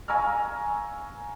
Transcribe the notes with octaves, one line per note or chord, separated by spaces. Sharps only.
F5 G#5 A#5 C#6 E6 F6